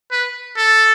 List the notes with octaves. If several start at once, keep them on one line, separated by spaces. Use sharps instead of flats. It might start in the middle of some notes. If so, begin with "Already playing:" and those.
B4
A4